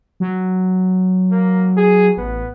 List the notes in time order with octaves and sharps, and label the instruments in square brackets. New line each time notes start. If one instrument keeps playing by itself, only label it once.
[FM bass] F#3
[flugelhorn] A#3
G#4
[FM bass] A1 [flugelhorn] B3